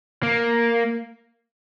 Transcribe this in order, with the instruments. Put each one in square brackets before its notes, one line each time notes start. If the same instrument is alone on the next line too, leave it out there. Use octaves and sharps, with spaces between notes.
[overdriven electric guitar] A#3